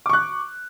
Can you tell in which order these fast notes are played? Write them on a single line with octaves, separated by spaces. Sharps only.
D6 C#6 F#6